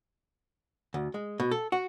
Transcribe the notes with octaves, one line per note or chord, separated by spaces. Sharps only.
D2
G#3
B2
A4
F#4